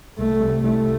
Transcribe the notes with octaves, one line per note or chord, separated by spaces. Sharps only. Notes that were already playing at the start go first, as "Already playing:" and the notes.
C2 A3
C3 G3
C2 A3